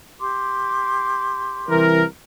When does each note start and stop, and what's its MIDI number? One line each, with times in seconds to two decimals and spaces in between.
0.20 1.83 67
0.20 1.83 84
0.20 1.83 86
1.69 2.03 36
1.69 2.03 52
1.69 2.03 70